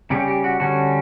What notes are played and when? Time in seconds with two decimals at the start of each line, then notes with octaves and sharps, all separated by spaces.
0.10 C#3 G3 C#4 G4
0.28 G4
0.44 F#4
0.60 D3 G3 C#4 F#4